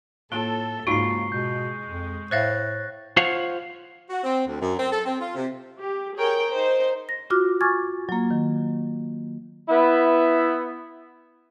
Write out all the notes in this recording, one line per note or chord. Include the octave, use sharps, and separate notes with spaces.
A2 A#3 F4 A4 G7
C#2 G#2 A#3 D#4 F4 F#4 C#6 C7
B2 G#3 G6
F2
A2 C5 E5 F5 F#6 A6 A#6
F4 C5 C#5 F5 F#5
F#4
C4
D2
F#2
C4
A4
C4
F4
C3
G4
G#4 A#4 C#5 G5
D#4 C5
A#6
F4 F#4 D6 F6
G#5 C#6 D6 F6 G#6 A6
F#3 A#3
D#3
B3 E4